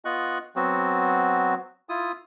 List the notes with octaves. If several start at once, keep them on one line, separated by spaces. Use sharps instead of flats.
B3 F4 D#5 C#6 F#6
F#3 B3 C4 F#4
E4 F4 D#6